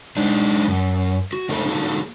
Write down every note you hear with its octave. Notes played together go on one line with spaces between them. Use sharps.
G#3 D4 D#4
F#2
F#4
C3 A3 A#3 D#4 A4
A#3 D#4 F#4 G#4 A4